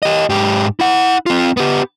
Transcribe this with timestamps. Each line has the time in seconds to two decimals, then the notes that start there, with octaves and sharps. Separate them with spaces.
0.03 G4 D#5
0.30 G#2 G4
0.80 E4 F#5
1.26 C4 F4
1.57 B3 G4